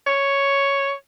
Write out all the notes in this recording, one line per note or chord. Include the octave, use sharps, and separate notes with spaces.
C#5